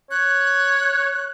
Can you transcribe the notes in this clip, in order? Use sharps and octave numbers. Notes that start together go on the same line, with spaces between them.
C#5 F#6